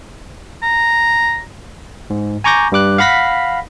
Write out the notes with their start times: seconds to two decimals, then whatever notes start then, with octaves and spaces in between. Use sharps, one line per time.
0.63 A#5
2.10 G#2
2.44 G#5 A#5 C#6 D6 G6 A#6
2.72 G2 G3 D6 F#6
2.98 F5 F#5 B5 A#6 B6